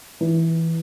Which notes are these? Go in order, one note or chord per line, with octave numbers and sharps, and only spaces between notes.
E3